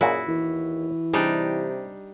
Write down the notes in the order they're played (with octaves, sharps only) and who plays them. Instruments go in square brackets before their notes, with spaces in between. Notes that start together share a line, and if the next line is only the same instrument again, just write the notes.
[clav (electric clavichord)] F#2 A#2 [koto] E4 F#4 [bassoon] G#4
[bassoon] D#2 [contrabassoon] E3
[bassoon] C3 [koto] G3 D4 D#4 [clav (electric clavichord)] G#4